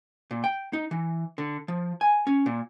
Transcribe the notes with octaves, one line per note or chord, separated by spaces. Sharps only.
A#2
G5
D#4
E3
D3
F3
G#5
C#4
A#2